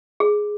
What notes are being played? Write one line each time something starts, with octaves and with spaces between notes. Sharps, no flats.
G#4